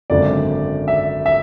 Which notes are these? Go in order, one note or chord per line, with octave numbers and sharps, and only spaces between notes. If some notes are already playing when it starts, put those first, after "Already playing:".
G#1 F#2 D3 D5
E5
E5